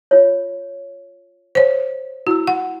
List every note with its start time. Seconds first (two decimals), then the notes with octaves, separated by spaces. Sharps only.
0.11 F4 C#5
1.55 C5 C#5
2.27 E4 F#4 E6
2.47 F#4 F#5